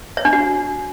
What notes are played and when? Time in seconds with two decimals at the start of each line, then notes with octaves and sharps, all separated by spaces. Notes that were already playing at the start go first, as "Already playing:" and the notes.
0.17 C#5
0.25 D4
0.33 F#4